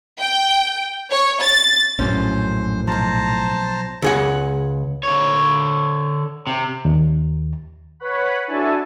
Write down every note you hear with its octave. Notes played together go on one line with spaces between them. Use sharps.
G5
C#5
A6
A#1 F#2 A2 C#4 C5
B1 F3 C5 A5 A#5
C#2 G#4 F#5
D3 C#5
C3
D#2
B4 C#5 F#5 B5
D4 E4 F#4 A4 G#5 A5